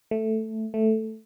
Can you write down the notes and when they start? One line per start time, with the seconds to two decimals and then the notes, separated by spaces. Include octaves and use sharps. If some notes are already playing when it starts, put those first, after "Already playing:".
0.11 A3
0.74 A3